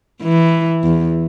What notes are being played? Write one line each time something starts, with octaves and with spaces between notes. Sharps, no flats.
E3
E2